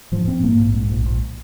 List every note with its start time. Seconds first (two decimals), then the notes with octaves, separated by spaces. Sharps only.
0.12 G#2 F3
0.27 G#2 C4
0.43 G#2 A#3
0.59 A#1
0.74 G#2
0.90 A#1
1.06 A#1